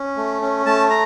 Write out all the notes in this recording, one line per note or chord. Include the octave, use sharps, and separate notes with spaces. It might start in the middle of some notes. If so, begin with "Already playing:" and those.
Already playing: C#4
A3
C#4
A3 A5
A#5